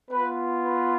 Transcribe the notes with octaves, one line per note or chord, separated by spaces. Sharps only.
B3 F4 B4
B4